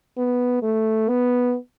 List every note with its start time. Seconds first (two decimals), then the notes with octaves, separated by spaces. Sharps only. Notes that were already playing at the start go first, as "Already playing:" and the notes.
0.18 B3
0.63 A3
1.09 B3